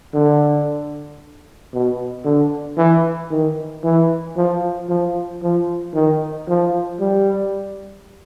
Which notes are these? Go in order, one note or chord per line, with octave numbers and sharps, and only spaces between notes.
D3
B2
D3
E3
D#3
E3
F3
F3
F3
D#3
F3
G3